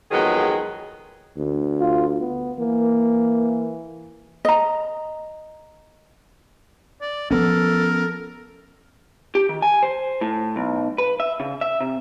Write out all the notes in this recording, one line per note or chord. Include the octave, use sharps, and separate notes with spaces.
F2 D#3 F#3 G#3 B3 G#4
D2
F4
B3
E3 A#3
D#5 A#5
D5
F3 B3 C#4 A4 A#4
G4
D#3
G#5
C5
A2
B1
B4
E5
C#3
E5
C3